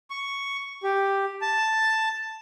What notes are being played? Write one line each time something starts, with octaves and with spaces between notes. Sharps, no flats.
C#6
G4
A5